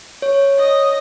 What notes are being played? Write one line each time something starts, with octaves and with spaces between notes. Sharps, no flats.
C#5
D#5